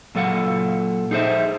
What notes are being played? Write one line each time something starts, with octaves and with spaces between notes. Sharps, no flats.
A#2 F#3 A4 F5 F#5
D#4 G#4 A#4 C5 E5